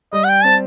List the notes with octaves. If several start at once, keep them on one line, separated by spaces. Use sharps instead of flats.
G3 D#5
F#5
G5
C4 A5